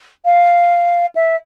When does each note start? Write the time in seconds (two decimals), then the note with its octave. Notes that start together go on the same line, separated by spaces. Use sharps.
0.25 F5
1.15 E5